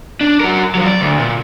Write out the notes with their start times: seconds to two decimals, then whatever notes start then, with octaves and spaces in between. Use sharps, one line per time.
0.21 D4
0.40 F#4 A#4
0.75 F3 F#3
0.86 D5
1.01 D2
1.19 A#2